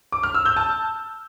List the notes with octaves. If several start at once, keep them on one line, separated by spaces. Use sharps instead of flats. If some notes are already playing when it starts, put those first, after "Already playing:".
D6
F6
E6
G6
A5